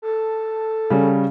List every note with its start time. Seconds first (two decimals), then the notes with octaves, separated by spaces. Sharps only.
0.02 A4
0.90 C#3 G3 C#4